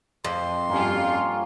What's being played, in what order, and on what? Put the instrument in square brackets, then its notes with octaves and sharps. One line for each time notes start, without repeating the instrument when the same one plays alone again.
[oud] F2 [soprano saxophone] C6
[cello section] G2 F4 [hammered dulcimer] A#3 C#4 G4